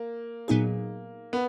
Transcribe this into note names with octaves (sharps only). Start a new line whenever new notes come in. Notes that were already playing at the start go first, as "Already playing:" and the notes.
Already playing: A#3
A#2 F#3 B3 D#4 G#4
B3